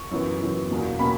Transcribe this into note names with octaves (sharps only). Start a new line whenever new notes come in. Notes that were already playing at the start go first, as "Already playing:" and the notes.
Already playing: C#6
F#2 E3 B3
F#2 E3 B3
E2 B2 A#3 C#4
B2 A#3 C#4 B5